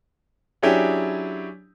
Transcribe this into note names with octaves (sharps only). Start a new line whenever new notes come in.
F#3 C#4 D4 E4 G4 G#4